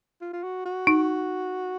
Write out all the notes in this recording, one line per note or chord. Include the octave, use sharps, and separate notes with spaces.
F4
F4
F#4
F#4
D#4